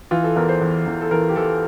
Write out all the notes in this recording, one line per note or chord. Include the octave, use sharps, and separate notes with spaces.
E3 F4
A4
E2 A#4
C5
E2
E2
A4
E3 A#4
G4
E3 A4